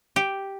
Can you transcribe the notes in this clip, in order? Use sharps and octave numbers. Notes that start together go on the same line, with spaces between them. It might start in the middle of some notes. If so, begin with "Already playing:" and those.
G4